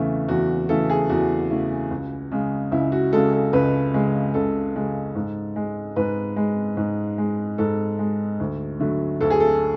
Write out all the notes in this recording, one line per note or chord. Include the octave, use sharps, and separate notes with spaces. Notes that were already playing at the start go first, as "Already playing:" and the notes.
Already playing: E2 C#3 E3 A3
E2 F#4
C#3 E3 A3 A4
G#4
E2 F#4
C#3 E3 A3
C#2
C#3 G#3
C#2 E4
F#4
C#3 G#3 A4
A4
C#2 B4
C#3 G#3
C#2 A4
C#3 G#3
G#2
G#3
G#2 B4
G#3
G#2
G#3
G#2 A4
G#3
D2
D3 F#3 A3
D2 A4
G#4
A4